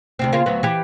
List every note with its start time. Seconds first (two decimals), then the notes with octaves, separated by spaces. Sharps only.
0.19 D2 C3 C4
0.33 C#3 A#3 F4
0.46 D2 F#3 B3
0.63 E3 G4